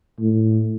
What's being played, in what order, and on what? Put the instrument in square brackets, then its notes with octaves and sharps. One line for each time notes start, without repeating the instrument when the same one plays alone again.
[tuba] A2